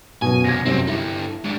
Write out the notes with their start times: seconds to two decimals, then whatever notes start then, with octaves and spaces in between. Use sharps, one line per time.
0.22 F#2 B2 G#5
0.44 F#2 C3 G#6 A#6
0.65 C2 F#2 C3 C4 C#4
0.87 G2 E4 A4
1.44 G#2 D4